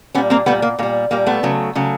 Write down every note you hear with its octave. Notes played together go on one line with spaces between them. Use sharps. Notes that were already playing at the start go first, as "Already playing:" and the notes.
A#2 G3 B3 C#4
A#3 C4
A#2 G3 A3 B3
A#3
A#2 G3 A#3
A#2 G3 A#3
A3 B3
C#3 F#3 A3
C#3 F#3 A3